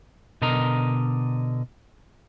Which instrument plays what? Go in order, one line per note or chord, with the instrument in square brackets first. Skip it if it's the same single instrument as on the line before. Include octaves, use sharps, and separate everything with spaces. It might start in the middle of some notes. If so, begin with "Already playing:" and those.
[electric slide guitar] B2 D3 A#4 D#5 A#5